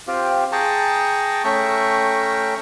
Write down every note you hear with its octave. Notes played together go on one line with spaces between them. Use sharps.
C4 F4 G4
G#4 G5 A5 A#5 C#6
A3 C#4 E5 G5 A#5 C#6